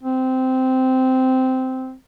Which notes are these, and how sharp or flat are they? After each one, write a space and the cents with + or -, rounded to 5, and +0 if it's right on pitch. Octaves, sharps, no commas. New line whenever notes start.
C4 -10